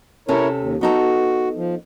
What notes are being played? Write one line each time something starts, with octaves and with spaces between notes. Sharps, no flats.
C3 C#4 E4 A4 A#4 C#5
D#2
B3 D#4 F#4 A4
F3